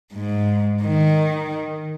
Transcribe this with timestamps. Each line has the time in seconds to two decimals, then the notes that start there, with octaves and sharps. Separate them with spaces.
0.13 G#2
0.82 D#3